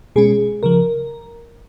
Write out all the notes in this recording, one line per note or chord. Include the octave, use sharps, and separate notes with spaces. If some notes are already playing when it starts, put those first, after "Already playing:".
B2 G#3 C#4 G#4
C#3 F3 A#4